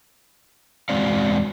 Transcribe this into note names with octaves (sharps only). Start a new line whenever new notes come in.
E2 G#3 C4 F#4 D5 F5